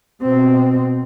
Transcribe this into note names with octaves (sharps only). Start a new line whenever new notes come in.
B2 C4